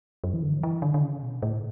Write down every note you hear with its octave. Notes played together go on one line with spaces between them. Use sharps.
F#2
E3
D3
F#3
E3
D3
D3
C#3
B2
A2